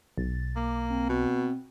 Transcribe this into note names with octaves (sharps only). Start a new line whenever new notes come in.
B1 A6
A#3 D6
C4
B2